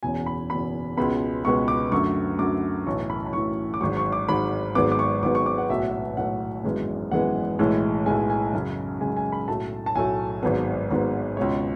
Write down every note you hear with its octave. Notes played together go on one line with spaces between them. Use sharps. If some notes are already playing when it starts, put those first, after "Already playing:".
F#1 E2 B2 G#5
B5
F#1 E2 B2 B5
C#2 B2 G#3 B3 B5
C#2 B2 G#3 B3 C#6
D6
F#2 D3 A3 C#6
F#2 D3 A3 D6
B1 A2 E3 C#6
B5
B5
B1 A2 E3 C#6
D6
G#1 G#2 F#3 C#6
C#6
D6
G#1 G#2 F#3 B5
G#1 G#2 F#3 B3 D6
D6
C#6
G#1 G#2 F#3 B3 D6
C#6
D6
F#5
B1 A2 F#3 B3 E5
F#5
E5
B1 A2 F#3 B3 F#5
G#1 F#2 E3 G#3 B3
G#1 F#2 E3 G#3 B3 F#5
B1 A2 E3 G#3
B1 A2 E3 G#3 G#5
G#5
F#2 C#3 G#3
F#2 C#3 G#3 G#5
G#5
B5
B1 A2 F#3 A3 A5
A5
B1 A2 F#3 A3 G#5
G#1 G#2 F#3 B3
G#1 G#2 F#3 B3
C#2 B2 G#3 C#5